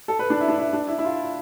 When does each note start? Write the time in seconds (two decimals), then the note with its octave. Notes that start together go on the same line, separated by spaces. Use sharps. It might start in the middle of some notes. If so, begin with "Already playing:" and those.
0.08 A4
0.19 B4
0.30 D4
0.40 E4
0.48 D4
0.58 E4
0.73 D4
0.88 E4
0.98 E4
1.05 F4